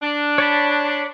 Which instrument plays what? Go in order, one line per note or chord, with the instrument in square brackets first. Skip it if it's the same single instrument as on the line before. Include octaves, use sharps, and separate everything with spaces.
[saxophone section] D4
[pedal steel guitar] C#5 A5 B5